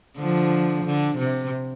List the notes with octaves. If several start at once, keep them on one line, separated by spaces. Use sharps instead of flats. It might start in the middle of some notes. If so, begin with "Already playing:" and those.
D3 F3
D3
C3